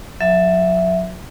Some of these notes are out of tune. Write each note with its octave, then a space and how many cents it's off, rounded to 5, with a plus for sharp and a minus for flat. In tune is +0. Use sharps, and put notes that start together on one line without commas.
F#3 -35 E5 +0